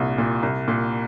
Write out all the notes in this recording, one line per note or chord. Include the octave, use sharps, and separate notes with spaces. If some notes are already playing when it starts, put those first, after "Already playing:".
Already playing: C2 A#2
A#2
C2
A#2